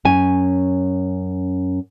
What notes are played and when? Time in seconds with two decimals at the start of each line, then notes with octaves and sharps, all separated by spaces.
0.05 F#2 C#4 G#5